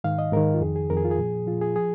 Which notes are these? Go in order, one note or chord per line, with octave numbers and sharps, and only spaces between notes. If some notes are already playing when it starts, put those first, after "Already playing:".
G#2 D#3 F5
D#5
G#2 D#3 A#4
F4
F2 D#3 G#4
G#4
F2 D#3 A#4
G#4
F4
G#4
A#2 F3
A#2 F3 F4
G#4
F3 G#4